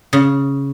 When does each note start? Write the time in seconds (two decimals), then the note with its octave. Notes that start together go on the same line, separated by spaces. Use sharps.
0.13 C#3